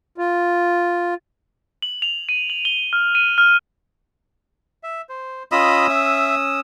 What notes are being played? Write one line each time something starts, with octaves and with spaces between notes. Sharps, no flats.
F4
F#7
F7
D#7
F#7
G7
F6
D#7
F6
E5
C5
C#4 F4 D#5 B5 D#6 E6
E5